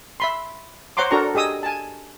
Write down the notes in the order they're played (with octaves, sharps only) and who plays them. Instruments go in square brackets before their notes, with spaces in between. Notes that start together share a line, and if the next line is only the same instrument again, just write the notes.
[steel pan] E5 B5 C6
C5 C#5 F#5 A#5 C6 D6
D4 F#4 A4 A#4 A#5 C#6
G4 G#4 D#5 D#6 E6
G#5 A5